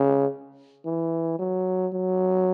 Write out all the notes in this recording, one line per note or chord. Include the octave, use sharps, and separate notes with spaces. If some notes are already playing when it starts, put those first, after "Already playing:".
Already playing: C#3
E3
F#3
F#3